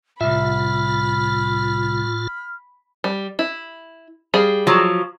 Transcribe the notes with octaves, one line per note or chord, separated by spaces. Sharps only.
C2 A2 F4 E5 B5 F6
G3
E4
G3 G#4 F5
F3 F#3